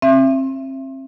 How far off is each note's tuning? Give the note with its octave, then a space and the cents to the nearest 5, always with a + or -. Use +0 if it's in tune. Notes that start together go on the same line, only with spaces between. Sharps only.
C4 +35 E5 +25